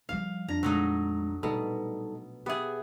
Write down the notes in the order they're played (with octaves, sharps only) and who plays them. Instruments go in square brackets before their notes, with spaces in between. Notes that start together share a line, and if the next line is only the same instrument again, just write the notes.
[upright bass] F3 G3 [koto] F5
[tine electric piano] F2 D4 A#6 [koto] A#5
[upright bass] A#1 G#3 [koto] F#3 A3 D#4
[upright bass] A#1 [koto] B2 [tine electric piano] G3 D#4 A4
[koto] B3 G#4 [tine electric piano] G4 E5